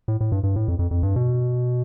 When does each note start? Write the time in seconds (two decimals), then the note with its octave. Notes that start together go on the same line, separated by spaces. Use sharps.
0.08 A2
0.21 A2
0.32 G2
0.43 G2
0.56 A2
0.68 F2
0.79 F2
0.91 F2
1.03 G2
1.16 B2